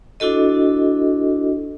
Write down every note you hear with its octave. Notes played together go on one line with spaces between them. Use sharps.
D4 E4 F#4 A4 D#5